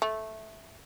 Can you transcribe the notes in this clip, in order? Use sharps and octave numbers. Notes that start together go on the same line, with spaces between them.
A3